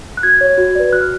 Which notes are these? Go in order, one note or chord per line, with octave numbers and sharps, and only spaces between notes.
F#6
F#4 G#6
C#5
F#4
B4 D5
F#4 F#6
F6